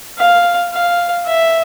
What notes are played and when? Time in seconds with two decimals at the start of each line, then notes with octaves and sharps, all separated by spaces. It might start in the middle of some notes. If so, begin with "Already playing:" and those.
0.19 F5
0.73 F5
1.27 E5